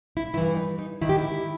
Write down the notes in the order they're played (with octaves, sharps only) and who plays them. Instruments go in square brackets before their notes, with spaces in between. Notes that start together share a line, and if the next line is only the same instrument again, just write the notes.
[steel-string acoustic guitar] E4
G2 E4
E3
D#4
D#4
G#2 D#3 E4
G4
E4